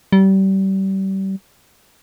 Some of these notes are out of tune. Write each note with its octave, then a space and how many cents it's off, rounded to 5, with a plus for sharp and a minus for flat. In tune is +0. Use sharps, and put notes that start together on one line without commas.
G3 -30